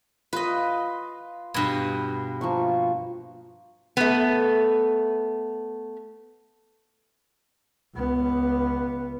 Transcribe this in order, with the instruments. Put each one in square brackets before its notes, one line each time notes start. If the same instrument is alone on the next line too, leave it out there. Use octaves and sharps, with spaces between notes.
[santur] F4 [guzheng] B4 D#5
[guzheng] G2 B2
[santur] F3 A#3 C#6
[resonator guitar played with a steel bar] A3 B3
[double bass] C#2 B3